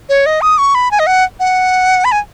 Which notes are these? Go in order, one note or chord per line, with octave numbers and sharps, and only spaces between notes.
C#5
D#5
D#6
C#6
B5
G#5
D#5
F#5
F#5
B5
G#5